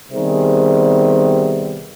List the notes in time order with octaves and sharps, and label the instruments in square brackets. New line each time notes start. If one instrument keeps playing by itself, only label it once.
[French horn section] C3 D#3 G3 B3 G#4